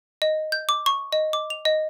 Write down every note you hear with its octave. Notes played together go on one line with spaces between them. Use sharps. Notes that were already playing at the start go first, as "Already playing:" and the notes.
D#5
G6
D6
C#6
D#5
D6
F7
D#5